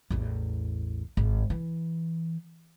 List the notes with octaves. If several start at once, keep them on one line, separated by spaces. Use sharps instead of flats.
A1 E2
G#1
E3